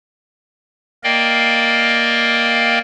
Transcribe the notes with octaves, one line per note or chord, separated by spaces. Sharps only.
A#3 A#4 D5 D#5 F5 G5